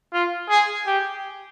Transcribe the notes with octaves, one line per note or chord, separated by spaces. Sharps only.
F4
G#4
G4